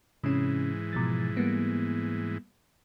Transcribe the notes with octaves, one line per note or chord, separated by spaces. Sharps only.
G#2 C3 E3 C#4
B2 F3 A6
G3 A#3 B3